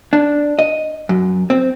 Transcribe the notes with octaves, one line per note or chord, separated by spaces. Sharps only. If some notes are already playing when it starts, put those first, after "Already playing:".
D4
D#5
F#2
C4